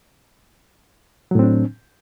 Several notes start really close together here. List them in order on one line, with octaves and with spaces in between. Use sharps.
F#3 A2 C4 D4